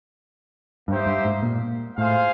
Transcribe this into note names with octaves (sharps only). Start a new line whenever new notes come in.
G2 A#3 D#4 G4 C5 E5
G2
G#2
A#2
A2 F4 G#4 C5 F5